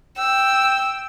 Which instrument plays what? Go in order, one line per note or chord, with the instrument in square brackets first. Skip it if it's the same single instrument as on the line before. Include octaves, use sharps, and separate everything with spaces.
[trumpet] G5 [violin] E6